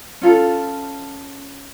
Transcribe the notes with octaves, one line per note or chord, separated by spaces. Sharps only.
C#4 F4 A4